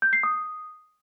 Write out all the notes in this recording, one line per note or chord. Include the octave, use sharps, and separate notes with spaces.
G6
C7
D#6